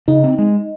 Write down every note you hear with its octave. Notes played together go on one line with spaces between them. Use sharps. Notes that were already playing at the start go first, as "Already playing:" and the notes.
C#3 D#4
C4
G#3